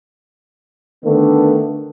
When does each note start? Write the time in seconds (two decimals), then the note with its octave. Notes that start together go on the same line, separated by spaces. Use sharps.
1.05 D3 D#3 A3 B3 D4